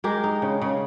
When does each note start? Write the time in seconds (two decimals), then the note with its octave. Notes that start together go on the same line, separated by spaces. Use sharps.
0.04 G#3 G4 A#4
0.24 D#4
0.42 C#3
0.62 C#3